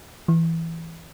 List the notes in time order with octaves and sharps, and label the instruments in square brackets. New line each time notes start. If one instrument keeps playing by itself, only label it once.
[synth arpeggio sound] E3